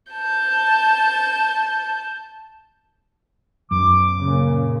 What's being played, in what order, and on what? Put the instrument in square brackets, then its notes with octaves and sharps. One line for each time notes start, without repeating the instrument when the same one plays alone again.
[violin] A5 G6
[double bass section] B1 [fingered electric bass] F#2 F#3 [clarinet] D6
[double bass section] A#2 C#3 A#3